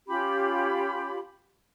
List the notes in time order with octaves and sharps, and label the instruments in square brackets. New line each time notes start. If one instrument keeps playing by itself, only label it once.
[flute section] C#4 F4 G4 B5